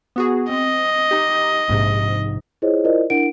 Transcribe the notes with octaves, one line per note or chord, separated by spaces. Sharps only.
B3 F#4 G#4
C4 D#5
D#4 G4
A#1 G#2 C3
E4 F4 G#4 C5 C#5 D#5
E4 F4 A#4 C5 D5 D#5
D4 E4 A#4 F#5 D7